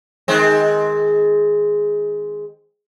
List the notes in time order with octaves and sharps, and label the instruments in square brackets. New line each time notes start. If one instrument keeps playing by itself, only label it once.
[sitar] D#3 G#3 C4